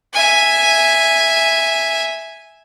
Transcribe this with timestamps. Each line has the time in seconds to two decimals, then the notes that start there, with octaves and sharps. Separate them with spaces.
0.13 E5 G#5